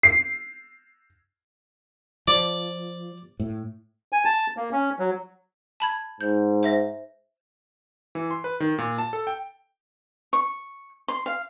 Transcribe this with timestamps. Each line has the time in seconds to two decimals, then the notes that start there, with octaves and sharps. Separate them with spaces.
0.03 C7
2.28 F3 D5
3.40 A2
4.12 G#5
4.25 A5
4.57 A#3
4.72 C#4
4.99 F#3
5.80 A5 B5 G#6
6.21 G#2 G6
6.63 C5 E5 A#6
8.15 E3
8.31 C6
8.44 B4
8.60 D#3
8.78 A#2
8.98 A5
9.13 A4
9.27 G5
10.33 C#6
11.08 C6
11.26 F5